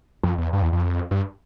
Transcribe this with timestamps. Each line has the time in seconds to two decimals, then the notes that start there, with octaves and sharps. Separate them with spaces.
0.24 F2
0.38 E2
0.53 G2
0.62 E2
0.73 F2
1.11 G2